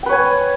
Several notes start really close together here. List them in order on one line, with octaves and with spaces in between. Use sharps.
G5 B4 C#5 G#5